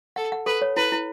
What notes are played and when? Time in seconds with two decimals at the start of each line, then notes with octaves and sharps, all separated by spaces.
0.16 A4 F#5
0.32 F#5
0.46 A4 B4
0.62 C#5
0.76 E4 B4
0.92 E4